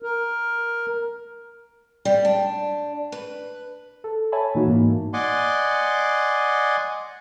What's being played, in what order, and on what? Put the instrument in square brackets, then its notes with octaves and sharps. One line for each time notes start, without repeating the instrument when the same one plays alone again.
[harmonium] A#4
[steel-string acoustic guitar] G3
D4
B4
[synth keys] A4
C#5 E5 G#5 A5 B5
A#2 E3 A#3 D#4 F#4
G#2 A#3
[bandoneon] D5 D#5 F#5 G#5 C6 D6